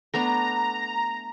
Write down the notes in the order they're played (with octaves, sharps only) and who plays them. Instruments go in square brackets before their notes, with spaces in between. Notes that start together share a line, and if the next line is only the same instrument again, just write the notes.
[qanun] A3 B3 D4 [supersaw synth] A#5